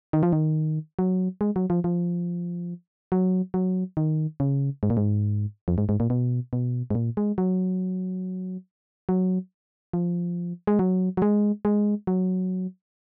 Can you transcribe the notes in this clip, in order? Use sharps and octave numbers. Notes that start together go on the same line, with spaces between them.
D#3
F3
D#3
F#3
G#3
F#3
F3
F3
F#3
F#3
D#3
C#3
G#2
A#2
G#2
F2
G#2
G#2
A#2
B2
B2
G#2
A#2
G#3
F#3
F#3
F3
G#3
F#3
F#3
G#3
G#3
F#3